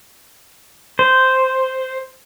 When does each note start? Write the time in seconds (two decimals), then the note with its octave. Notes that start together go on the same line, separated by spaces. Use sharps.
0.99 C5